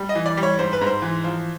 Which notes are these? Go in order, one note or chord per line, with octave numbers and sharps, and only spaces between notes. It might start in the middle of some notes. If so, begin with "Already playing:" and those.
Already playing: G3
D#5
E3
D5
G3
C#5
G#2 C5
B4
G#2
C5
E3
F3